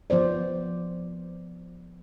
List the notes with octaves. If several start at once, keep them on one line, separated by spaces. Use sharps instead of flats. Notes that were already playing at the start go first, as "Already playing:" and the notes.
F3 B3 C5 D5